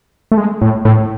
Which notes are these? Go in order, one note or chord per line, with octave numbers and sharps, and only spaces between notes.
A3
G#3
A2
A2